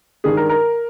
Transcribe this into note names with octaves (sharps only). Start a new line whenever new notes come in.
G2 D#3 G#3 G#4
A#4
A#4